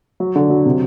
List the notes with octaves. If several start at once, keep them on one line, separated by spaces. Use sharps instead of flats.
F#3
D3
F#3
C3